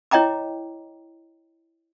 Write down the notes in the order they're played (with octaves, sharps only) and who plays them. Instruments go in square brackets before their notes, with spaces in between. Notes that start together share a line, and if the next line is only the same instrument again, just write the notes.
[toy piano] E4 C#5 D#5 G5 A#5 D6